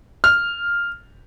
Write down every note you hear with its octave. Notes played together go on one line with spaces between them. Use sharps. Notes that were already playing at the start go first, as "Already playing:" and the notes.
F6